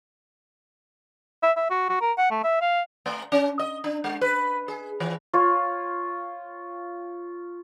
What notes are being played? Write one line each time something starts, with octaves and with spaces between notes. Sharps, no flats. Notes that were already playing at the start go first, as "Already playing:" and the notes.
E5
E5
F#4
F#4
A#4
F#5
A3
E5
F5
A3
C#4
D#5
D4
G#3
B4
G#4
E3
F4 C#5